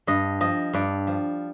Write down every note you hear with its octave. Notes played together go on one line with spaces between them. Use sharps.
G2 D#5
F3 D#5
G2 D5
F3